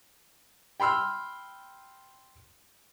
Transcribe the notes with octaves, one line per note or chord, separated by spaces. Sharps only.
G5 B5 C6 E6 F6